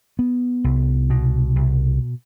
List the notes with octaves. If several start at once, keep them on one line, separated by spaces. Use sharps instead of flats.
B3
C2
B2
C2